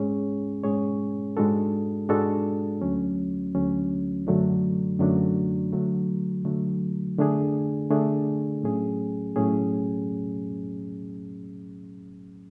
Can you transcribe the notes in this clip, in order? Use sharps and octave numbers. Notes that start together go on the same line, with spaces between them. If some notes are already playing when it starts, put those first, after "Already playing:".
Already playing: G#2 G#3 C#4 G#4 C#5
G#2 G#3 C#4 G#4 C#5
G#2 G#3 D4 F#4 A4
G#2 G#3 D4 F#4 A4
D2 D3 F#3 A3 C#4
D2 D3 F#3 A3 C#4
F#2 D3 F#3 A3 D4
F#2 D3 F#3 A3 D4
D3 F#3 A3
D3 F#3 A3
D3 A3 D4 G#4
D3 A3 D4 G#4
A2 F#3 A3 C#4 G#4
A2 F#3 A3 C#4 G#4